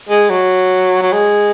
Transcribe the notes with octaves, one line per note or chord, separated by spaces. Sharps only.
G#3
F#3
F#3
G#3